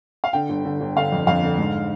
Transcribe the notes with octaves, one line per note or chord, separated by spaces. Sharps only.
F5
D3 G5
G1
D3
G1
D3 F5
F2
F2 F5
D3
G#2